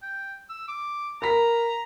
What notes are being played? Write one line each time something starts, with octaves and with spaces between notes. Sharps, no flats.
G5
E6
D6
A#4 A#5 B5 B6